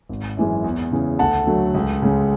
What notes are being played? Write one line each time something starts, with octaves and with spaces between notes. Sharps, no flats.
G#1
F#2 E3 G#3
E2
C#3 E3
D2 F#5 A5
D3 F#3 A3
C#2
C#3 G#3